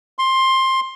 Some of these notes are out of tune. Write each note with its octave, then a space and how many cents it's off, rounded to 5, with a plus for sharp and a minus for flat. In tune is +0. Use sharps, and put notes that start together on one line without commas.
C6 +15